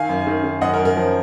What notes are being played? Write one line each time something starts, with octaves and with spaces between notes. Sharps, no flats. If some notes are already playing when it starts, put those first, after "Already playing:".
Already playing: D#3 F5 G#5
F#2
D#3
D#3
F#2 D#5 F#5
A#4
F#2
A#4
F3